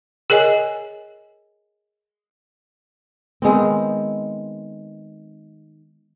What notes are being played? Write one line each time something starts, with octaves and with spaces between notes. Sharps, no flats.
G#4 A#4 C#5 D#5 G#5
D#3 G#3 B3 C4